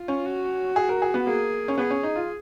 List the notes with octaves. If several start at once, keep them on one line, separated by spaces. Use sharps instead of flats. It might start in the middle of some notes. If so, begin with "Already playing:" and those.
Already playing: F4
C#4
F#4
G#4
A#4
G#4
B3
A#3 G#4
C#4
B3 G#4
C#4
D#4
F4